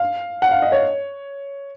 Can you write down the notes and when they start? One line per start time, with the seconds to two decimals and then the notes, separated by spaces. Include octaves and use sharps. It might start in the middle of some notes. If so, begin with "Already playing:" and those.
Already playing: F5
0.42 F#5
0.51 F5
0.62 D#5
0.72 C#5